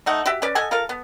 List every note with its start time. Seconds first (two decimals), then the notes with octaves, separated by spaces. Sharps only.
0.06 A3 D#4 F#5
0.26 F#4 G4 E5
0.42 C#4 B4 D5
0.55 A4 D#5 F#5 G#5
0.71 F4 A4 A#4 F5
0.89 B3